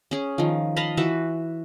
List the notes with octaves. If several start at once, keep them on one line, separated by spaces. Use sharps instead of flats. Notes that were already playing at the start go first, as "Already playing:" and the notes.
C#4 G#4
D#3 F3
D#5 F5 A5 B5
E3 F#4 B4 E5